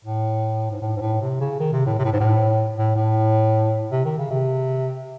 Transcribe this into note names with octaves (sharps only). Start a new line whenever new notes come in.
A2
G#2
A2
G#2
A2
C3
C#3
D#3
C3
A2
C3
A2
G#2
A2
A2
A2
C3
D#3
C#3
C3